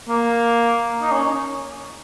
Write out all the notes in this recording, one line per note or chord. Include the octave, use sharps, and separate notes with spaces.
A#3
D#4
C#4